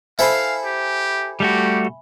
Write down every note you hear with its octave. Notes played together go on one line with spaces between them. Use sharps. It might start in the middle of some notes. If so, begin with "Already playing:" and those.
E4 A4 C5 E5 F5 G#5 B5
G4
G3 A3 F#4 G4